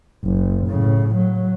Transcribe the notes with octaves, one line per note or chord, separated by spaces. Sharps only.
F#1
A2 C#3
F#3